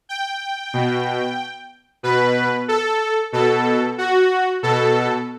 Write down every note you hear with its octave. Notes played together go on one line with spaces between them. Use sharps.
G5
B2
B2 B4
A4
B2 A4
F#4
B2 A4